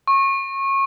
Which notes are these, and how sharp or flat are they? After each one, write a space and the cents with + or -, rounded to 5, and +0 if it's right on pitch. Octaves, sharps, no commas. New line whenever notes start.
C#6 -25